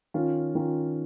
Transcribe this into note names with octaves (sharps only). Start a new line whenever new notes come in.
D#3 C#4 F4
D#3 C#4 F4